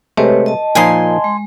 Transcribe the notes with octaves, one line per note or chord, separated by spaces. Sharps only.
C3 G#3 A3 G4 B4 C#5
D#5 A5
A#2 F3 D#4 G#5 C6
G#3